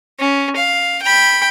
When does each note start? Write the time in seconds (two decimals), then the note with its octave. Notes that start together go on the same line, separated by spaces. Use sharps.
0.19 C#4
0.57 F5
1.02 G5 B5